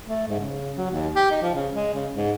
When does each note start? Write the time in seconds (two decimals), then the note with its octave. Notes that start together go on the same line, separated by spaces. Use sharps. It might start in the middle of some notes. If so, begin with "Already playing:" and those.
0.05 A3
0.28 G#2
0.40 C#3
0.77 F#3
0.90 D#2
1.15 G4
1.31 D#4
1.42 F3
1.55 C#3
1.73 G#3
1.94 C#3
2.12 G#2